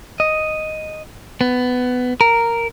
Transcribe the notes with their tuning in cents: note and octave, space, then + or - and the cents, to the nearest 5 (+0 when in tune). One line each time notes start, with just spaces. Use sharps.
D#5 +0
B3 +15
A#4 -5